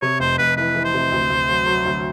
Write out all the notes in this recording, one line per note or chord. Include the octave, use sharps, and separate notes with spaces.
C3 C#5
F1 C5
F1 B4
E3 B4
E3
C5
C3
D2
D2
F#3
F#3
D2